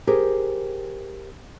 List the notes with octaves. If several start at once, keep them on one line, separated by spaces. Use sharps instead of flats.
G4 G#4 A#4 C5